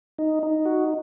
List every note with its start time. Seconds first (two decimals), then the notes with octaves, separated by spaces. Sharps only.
0.19 D#4
0.43 D#4
0.65 F#4